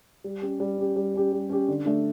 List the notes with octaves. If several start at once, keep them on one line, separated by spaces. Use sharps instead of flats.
G3
C#4 G4
G3
C#4 G4
G3
C#4 G4
G3
C#4 G4
D3
A3 D4